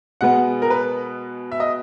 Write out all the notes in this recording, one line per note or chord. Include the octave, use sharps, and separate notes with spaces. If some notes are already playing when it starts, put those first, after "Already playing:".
B2 G#3 B3 F#5
A#4
B4
E5
D#5